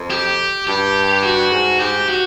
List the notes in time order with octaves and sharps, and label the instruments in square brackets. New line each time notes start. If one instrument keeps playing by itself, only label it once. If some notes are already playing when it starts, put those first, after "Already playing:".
Already playing: [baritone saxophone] F2
[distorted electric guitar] G4
[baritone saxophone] G2 [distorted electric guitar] G4
[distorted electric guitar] F#4
[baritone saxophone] G#2
[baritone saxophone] G#2 [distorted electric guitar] G4
[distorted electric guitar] F#4